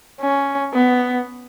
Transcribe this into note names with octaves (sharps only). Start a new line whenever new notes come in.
C#4
B3